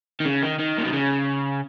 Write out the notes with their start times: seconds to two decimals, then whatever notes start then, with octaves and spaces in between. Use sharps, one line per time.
0.20 D#3
0.26 C#3
0.43 D#3
0.59 D#3
0.78 A#2
0.85 B2
0.93 C#3